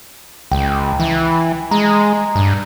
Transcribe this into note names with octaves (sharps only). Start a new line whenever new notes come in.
C#2 G5
E3
G#3 A#5
G2